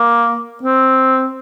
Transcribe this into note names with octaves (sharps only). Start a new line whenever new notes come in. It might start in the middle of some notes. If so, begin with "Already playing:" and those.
Already playing: A#3
C4